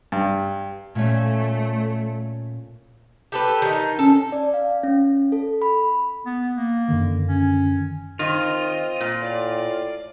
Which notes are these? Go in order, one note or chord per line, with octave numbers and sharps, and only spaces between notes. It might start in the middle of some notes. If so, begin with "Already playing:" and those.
G2
A#2 A3 C#4
G4 A4 B4
D#3 D#4
C#4 A4
D5
F5
C#4
A4
B5
B3
A#3
F#2 D3 D#3
C#4
D#3 C4 F4 D#5
A#2
A2 D5